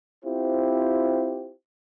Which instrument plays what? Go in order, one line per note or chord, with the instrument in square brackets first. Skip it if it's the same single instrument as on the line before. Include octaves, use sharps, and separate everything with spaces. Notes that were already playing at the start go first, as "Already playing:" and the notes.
[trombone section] C4 E4 F4 G4 C5